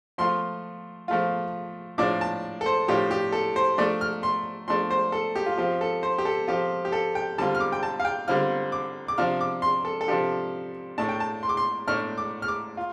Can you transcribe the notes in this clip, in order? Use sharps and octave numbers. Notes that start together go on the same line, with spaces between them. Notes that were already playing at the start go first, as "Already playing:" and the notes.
F3 A3 F4 C6
F3 A3 F4
A2 F3 D4 F4 D6
A5
A4
C5
A2 F3 D4 F4 G4
G4
A4
C5
F3 A3 D4 D5
F6
C6
F3 A3 D4 C6
C5
A4
G4
F4
F3 C4 F4 G4
A4
C5
G4
A4
F3 C4 F4 G4
G4
A4
G5
D3 G3 C4 F4 A5
F6
D6
G5
A5
F5
G5
D3 G3 C4 F4 F6
D6
D6
C3 F3 D4 F4 F6
D6
C6
A4
A4
C3 F3 D4 F4 G4
A2 A3 D4 A5
G5
A5
C6
D6
C6
A2 A3 D4 F6
D6
F6
D6
F4